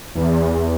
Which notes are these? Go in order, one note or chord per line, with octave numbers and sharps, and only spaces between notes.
E2